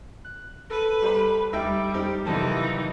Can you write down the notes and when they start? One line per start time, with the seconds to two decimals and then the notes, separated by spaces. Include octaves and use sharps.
0.25 F#6
0.70 A4 B4 D#7
1.02 G3 C5 B5
1.53 D2 G3 D#4 E5 G5
1.94 F2 D#4 G4 C5
2.26 F2 C3 D#3 E3 F#3 G3 D#4 A5